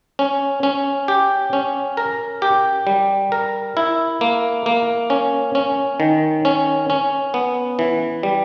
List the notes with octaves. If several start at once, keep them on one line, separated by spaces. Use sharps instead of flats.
C#4
C#4
G4
C#4
A#4
G4
G3
A#4
E4
A#3
A#3
C#4
C#4
D#3
C#4
C#4
B3
E3
G3